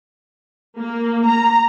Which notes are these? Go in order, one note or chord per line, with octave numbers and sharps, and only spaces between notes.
A#3
A#5